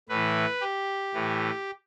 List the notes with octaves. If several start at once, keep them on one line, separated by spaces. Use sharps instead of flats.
A2 E3 B4
G4
A2 E3